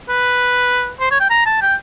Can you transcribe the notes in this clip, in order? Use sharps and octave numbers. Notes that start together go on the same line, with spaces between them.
B4
C5
C#5
G5
A#5
A5
G5